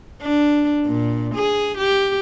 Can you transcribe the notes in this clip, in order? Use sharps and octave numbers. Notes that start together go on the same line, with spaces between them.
D4
A#2
G#4
G4